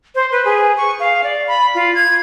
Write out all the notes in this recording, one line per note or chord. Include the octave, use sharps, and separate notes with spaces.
C5
B4
G#4
C#6
F5
D5
B5
F4
G#6